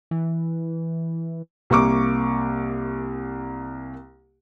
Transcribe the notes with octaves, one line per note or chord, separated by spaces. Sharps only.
E3
C2 A#3 C#6 D6